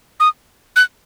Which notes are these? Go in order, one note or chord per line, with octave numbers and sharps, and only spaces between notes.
D#6
F#6